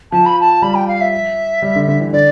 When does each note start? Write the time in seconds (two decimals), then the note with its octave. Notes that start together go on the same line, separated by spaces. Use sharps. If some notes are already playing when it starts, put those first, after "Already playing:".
0.12 F3 A5
0.26 B5
0.40 A5
0.62 G3 B5
0.74 G5
0.88 F5
1.00 E5
1.62 G3
1.76 D3
1.88 D3
2.00 E3
2.12 D3 D5